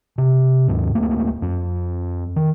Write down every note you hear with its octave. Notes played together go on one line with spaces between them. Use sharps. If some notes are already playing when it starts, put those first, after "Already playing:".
C3
D#2 G#2
D1 A3 A#3
F2
D#3